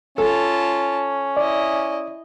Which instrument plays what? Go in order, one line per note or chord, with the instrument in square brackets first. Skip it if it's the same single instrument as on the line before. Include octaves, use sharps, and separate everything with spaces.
[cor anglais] C#4 [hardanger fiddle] F4 A5 [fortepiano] A4
[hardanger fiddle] E4 D#5 [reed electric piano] D5